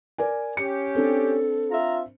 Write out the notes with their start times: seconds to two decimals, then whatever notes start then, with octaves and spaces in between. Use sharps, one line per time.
0.18 A#4 D5 G#5
0.57 C#4 G4 C#7
0.95 C4 D4 A4
1.71 F4 E5 A#5